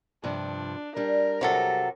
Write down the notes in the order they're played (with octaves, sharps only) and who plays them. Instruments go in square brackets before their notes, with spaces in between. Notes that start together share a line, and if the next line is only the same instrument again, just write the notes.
[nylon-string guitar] G2 C3 F3 [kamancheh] D4
[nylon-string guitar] G3 D4 [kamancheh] A#4
[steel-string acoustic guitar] C3 F#3 A4